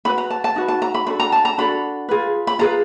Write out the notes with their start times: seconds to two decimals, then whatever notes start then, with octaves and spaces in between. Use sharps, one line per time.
0.05 D#4 F#4 B4 B5
0.18 A#5
0.30 A5
0.44 A5
0.56 D#4 F#4 B4
0.68 A5
0.82 A#5
0.94 B5
1.07 D4 F#4 A4 B5
1.20 A#5
1.32 A5
1.45 A#5
1.58 D4 F#4 A4 B5
2.09 F4 G#4 B4
2.47 B5
2.59 F4 G#4 B4 A#5